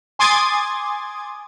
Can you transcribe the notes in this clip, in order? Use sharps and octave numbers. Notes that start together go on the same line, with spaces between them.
G#5 C6 D6 D#6 G#6 A6